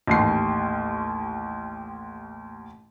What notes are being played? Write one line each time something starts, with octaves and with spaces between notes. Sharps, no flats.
A1 D#2 C7